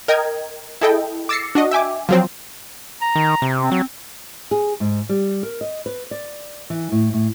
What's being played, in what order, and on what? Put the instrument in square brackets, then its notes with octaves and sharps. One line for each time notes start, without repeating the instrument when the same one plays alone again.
[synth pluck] A#4 D#5 G5 G#6
E4 G#4 A4 D#5 G5
D6 E6 A6 A#6 C7 C#7
D4 F#4 D#5
E5 G5 G#5 D6
F3 F#3 C4
[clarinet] A#5
[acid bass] D#3
C3
[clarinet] C4
[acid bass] F#3
[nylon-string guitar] G#4
G#2
G3
A#4
D#5
B4
D5
E3
A2
A2